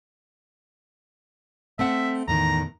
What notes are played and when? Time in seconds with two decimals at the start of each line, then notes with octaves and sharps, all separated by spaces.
1.79 A3 C4 E5 F#5
2.28 E2 A2 D#3 A#5